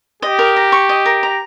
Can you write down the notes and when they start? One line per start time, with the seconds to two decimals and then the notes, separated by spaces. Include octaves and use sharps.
0.22 G4 D#5
0.39 A#4
0.56 A#5
0.72 C#6
0.89 D#5
1.06 A#4
1.23 A#5